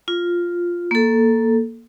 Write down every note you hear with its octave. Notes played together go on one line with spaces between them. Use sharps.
F4
A#3 A4